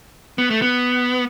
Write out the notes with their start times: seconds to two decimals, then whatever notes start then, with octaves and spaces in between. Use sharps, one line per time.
0.38 B3
0.50 A3
0.62 B3